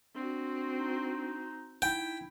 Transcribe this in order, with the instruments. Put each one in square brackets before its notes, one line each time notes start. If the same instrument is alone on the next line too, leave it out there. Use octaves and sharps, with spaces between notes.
[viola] C4 F#4 [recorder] D4
[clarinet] D#4
[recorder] D#4 [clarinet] E4 [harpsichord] G5